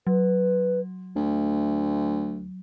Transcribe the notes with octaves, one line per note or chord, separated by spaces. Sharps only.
F#3 B4
D2 A3